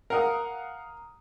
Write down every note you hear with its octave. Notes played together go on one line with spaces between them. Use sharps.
A#4 F5 F#5 D#6